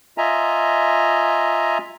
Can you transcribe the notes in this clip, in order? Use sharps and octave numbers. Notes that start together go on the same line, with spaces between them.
F4 D#5 E5 G#5 A#5